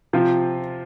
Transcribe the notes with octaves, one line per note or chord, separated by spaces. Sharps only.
C3 F3 C4 F4 C5